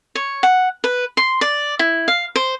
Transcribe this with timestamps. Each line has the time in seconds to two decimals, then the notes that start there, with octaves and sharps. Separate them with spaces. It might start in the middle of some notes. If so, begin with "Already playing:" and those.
0.15 C#5
0.43 F#5
0.84 B4
1.17 C6
1.41 D5
1.79 E4
2.08 F5
2.36 C5